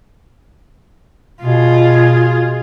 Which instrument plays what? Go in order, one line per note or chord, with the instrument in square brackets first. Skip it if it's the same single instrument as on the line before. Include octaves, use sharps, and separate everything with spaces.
[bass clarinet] B2 [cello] F4 G#4